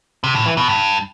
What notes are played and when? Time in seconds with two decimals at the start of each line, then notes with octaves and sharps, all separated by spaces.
0.24 C3
0.35 A2
0.46 E3
0.57 B2
0.68 G2